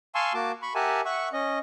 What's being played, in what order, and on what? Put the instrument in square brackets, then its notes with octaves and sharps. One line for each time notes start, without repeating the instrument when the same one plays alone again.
[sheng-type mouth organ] F5 G#5 A5 C6 C#6 E6
A#3 F#4 A5 D6
B5 C#6
G4 A#4 E5 F#5 G#5 A5
E5 F#5 C#6
C#4 D#5